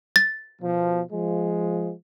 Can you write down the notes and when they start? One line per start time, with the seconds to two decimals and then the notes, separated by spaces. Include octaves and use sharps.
0.16 A6
0.61 B2 F3
1.11 F3 G#3